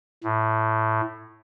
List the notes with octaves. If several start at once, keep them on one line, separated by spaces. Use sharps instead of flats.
A2